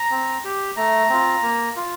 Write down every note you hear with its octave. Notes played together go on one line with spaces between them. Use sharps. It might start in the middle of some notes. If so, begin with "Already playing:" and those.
Already playing: A#5
C4
G4
A3 A#5
C4 F4
A#3
F4